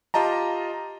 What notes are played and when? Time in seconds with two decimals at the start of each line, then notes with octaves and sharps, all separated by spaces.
0.14 F4 G4 D#5 A5 A#5